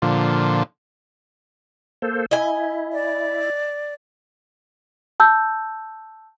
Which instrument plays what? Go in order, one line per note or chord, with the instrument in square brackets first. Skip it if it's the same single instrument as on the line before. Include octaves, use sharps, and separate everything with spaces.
[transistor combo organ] A#2 D3 F3
[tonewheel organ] A#3 A4 C5
[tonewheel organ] E4 [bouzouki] D#5 G#5
[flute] D5
[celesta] A5 E6 G6